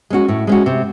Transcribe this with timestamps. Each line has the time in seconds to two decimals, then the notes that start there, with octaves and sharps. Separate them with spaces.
0.10 G#3 C#4 F#4
0.29 A2
0.47 G#3 C#4 F#4
0.66 C3